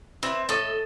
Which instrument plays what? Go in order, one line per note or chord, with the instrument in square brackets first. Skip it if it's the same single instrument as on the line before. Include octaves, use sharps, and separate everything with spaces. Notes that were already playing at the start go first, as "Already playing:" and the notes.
[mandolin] C4 [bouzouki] E4 G4 B4
[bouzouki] A2 [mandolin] A4 D#5